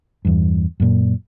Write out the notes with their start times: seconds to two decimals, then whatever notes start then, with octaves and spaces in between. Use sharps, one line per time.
0.25 E2 G2
0.80 F#2 A#2